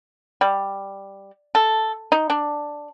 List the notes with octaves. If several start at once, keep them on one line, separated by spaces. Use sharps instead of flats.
G3
A4
D#4
D4